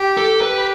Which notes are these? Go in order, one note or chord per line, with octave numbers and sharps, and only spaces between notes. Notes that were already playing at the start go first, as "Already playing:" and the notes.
Already playing: G4
A4
G4 B4